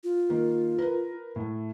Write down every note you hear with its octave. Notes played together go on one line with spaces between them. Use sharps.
F4
D#3 A#3
A#4 B4
A2 A3